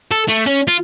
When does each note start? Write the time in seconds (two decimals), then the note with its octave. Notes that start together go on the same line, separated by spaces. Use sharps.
0.11 A4
0.28 A3
0.47 C#4
0.68 F4